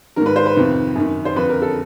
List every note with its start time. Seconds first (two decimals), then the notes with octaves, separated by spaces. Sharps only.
0.16 G#2 D#3 A#4
0.26 B4
0.36 C5
0.46 B4
0.56 F2 C3 D#3
0.95 F#2 D#3
1.25 C5
1.36 F2 D3 B4
1.49 A#4
1.62 A4